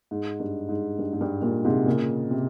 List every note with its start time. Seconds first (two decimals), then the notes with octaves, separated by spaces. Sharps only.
0.11 G#2
0.40 G2
0.69 G#2
0.99 G2
1.13 G#2
1.21 G2
1.42 G2 A#2
1.65 G#2 C3
1.86 A#2 C#3
2.31 C3